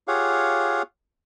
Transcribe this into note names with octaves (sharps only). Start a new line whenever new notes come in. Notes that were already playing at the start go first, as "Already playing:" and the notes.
F4 G4 G#4 C#5 F5 F#5